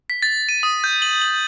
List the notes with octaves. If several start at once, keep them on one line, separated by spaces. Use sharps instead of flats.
B6
A6
D#7
D#6
G6
F#7
F#7